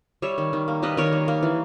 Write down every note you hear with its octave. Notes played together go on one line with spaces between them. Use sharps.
G3 C#5 E5
D#3
D#3
A#3
G3 B4 D#5
D#3 A#4 C#5
A#3
A#3
E3